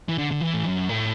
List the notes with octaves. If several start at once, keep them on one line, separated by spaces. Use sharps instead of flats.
E3
D3
D3
E3
A2
F#2
A2